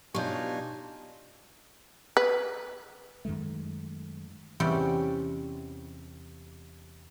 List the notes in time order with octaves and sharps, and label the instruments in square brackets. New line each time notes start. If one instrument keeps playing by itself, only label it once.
[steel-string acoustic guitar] B2 F4 [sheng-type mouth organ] D4 D#4 G#5 [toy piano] G4 C#5
[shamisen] B4
[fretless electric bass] F#2 D#3 G#3 A3
[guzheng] E2 C3 G3 C#4 G5